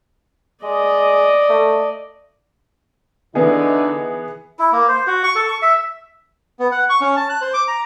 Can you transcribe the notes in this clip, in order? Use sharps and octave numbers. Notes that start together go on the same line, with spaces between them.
G#3 D5 D#5
A3
D3 E3 B3 D#4 G#4
E4
A#3
C5
F#4
C#6
A4
C#6
E5
B3
F#5
C#6
C#4
A5
F#6
C5
D6
A#5